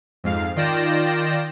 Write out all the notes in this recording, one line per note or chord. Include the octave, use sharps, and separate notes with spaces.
F2 G#2 F5
D#3 F4 D5 G5 A#6 E7